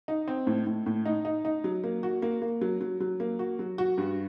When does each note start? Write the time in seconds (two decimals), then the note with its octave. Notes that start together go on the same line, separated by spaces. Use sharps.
0.08 D#4
0.28 C4
0.47 A2
0.66 A2
0.86 A2
1.06 D#4
1.25 D#4
1.45 D#4
1.64 F#3
1.84 A#3
2.03 F#4
2.22 A#3
2.42 A#3
2.61 F#3
2.81 F#3
3.00 F#3
3.20 A#3
3.39 F#4
3.59 F#3
3.78 F#4
3.98 G2